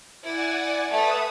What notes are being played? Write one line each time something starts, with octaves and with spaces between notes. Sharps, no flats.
E4 D5 F#5 G#5
A3 B4 E5 D#6